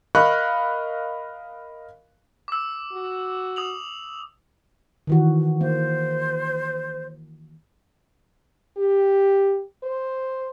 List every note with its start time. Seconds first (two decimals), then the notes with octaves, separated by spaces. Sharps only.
0.15 A#4 D#5 F5 B5 C#6 F#6
2.48 D6 E6
2.93 F#4
3.56 D#6 F7 F#7
5.07 D#3 E3 F#4
5.61 A#3 C5
8.77 G4
9.83 C5